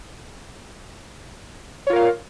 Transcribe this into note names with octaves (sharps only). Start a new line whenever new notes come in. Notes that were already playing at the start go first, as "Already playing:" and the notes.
F4 A#4 C#5 F5